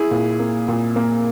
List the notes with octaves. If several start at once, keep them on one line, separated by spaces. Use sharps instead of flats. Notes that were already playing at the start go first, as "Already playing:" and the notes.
Already playing: E4 G#4
A#2
A#3
A#2
A#3